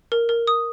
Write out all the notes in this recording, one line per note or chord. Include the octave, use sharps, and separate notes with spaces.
A#4
A#4
D#6